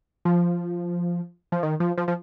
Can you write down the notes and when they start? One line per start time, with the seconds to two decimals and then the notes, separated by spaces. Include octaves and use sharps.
0.25 F3
1.52 F3
1.63 D#3
1.80 F3
1.98 F3
2.08 F3